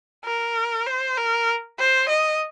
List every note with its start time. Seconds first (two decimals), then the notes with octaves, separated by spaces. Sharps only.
0.25 A#4
0.87 C5
1.18 A#4
1.79 C5
2.09 D#5